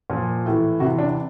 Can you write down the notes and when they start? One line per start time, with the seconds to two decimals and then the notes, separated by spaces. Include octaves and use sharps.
0.10 A#2 F3
0.46 A2 E3
0.80 C3 E3 F#4
0.98 D4